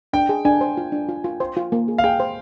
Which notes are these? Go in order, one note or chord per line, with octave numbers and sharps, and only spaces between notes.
D4 G5
G#4
D4 G#5
C5
F4
D4
F4
F4
C5
F4
A#3
G#4
F5
G#4 G5
C5